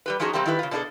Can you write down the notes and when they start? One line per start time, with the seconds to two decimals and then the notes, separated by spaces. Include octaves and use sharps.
0.06 G3 G4 B4
0.20 F3 C#4 D#4 F#4 G#4
0.33 C3 G3 A#3 C4 G4
0.46 D#3 E4 G4 B4
0.59 C#3 F4
0.71 B2 D4 D#4 G#4 A4